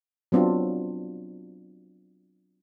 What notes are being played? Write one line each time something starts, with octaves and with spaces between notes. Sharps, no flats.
F#3 B3 C4 D4 F4